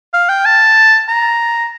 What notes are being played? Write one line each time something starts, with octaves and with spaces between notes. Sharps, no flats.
F5
G5
A5
A#5